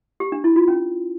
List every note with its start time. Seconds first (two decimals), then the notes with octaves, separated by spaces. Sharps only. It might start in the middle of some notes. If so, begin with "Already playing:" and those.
0.20 G4
0.32 D4
0.44 E4
0.56 F4
0.68 C#4